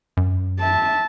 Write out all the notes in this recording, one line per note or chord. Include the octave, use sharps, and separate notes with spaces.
F#2
E5 A5